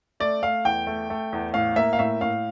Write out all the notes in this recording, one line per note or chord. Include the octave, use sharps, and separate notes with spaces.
A3 D5
A3 F5
E2 G5
A3
A3
E2
A2 F5
A#3 E5
F5
A2 E5
A2 F5